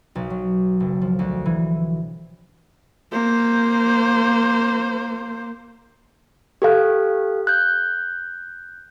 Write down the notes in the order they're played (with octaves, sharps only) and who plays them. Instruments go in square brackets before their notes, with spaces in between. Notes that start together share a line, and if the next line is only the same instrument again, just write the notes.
[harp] B1
F#3
F#1
F3
D2
E3
[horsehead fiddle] A#3 C5
[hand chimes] G4 A4 F5 F#6
F#6 G6